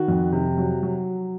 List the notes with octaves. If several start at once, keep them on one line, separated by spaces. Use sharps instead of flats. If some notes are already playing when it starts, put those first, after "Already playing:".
Already playing: D#3 F#4
F2
C3
F#3
F#3